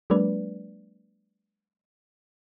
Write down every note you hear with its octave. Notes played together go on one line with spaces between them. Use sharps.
F#3 G#3 A#3 D4 B4 D5